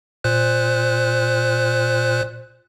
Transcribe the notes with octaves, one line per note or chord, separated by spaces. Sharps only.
A#2 C5 F#6